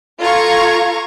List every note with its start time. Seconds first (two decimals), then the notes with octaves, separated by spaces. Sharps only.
0.21 F4 A4 A#5 C#6 G#6